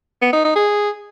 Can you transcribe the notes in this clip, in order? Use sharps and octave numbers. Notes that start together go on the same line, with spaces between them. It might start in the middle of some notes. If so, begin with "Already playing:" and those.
B3
D#4
D#4
G#4